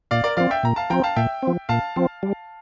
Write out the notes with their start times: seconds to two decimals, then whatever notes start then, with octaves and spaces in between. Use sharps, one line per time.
0.11 A#2 D5 F5
0.24 A#4 D5
0.37 F3 C4 D5 F5
0.51 E5 G5
0.63 A#2 A#5
0.76 F5 A5
0.90 F3 C4 G5 A#5
1.04 F5 A5
1.16 A#2 E5 G5
1.42 F3 C4
1.69 A#2 F5 A5
1.96 F3 C4
2.23 G3